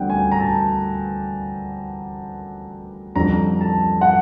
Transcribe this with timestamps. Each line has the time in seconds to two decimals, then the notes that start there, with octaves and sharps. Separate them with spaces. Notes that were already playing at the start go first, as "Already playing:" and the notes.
Already playing: D2 D3 G3 C4 F#5 G5
0.10 G#5
0.32 A#5
0.40 A5
3.15 F2 D3 G3 C4 A#5
3.61 A5
4.01 F#5